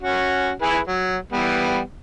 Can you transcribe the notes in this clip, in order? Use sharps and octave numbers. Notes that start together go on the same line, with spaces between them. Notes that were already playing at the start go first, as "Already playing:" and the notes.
C#4 F#4
E4 G#4 B4
F#3
E3 G3 B3